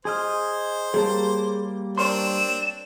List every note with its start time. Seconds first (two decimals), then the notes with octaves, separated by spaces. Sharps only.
0.05 G#4 C5 D#5 F6
0.94 G3 A#3 G#4 C#5 A5
1.98 C4 D4 A#4 C#5 C6 E7